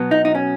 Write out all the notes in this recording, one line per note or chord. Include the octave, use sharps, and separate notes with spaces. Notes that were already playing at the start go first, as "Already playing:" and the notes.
Already playing: B2 F#3 B3
D#4
D#4
C#4